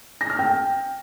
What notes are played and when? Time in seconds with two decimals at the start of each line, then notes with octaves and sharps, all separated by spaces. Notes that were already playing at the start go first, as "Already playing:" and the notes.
0.21 A#6
0.30 F6
0.39 G5